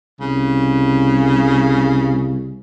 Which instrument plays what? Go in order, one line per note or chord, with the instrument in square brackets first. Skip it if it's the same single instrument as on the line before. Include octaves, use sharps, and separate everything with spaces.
[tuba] C2 [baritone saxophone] C#3